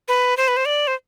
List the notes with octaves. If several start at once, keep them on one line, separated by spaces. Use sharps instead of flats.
B4
C5
B4
C5
D5
C5